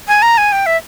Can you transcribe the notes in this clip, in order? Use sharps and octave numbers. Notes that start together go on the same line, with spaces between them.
G#5
A#5
G#5
G5
E5